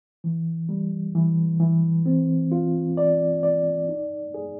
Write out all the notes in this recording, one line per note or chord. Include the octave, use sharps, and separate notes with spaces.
E3
G3
E3
E3
C4
F4
D5
D5
D#4
G#4